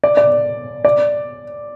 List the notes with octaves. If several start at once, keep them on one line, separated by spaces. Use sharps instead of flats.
D5
D5
D5